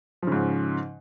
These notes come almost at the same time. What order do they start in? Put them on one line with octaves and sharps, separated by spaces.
F3 C#3 G#2